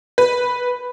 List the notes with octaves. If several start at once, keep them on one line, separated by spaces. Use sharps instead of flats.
B4